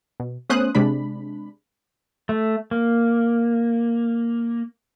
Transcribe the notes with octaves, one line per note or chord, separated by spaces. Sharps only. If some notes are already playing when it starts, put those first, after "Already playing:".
B2
A3 B3 C#4 C5 D#6 F#6
C3 G#3 D4 B5
A3
A#3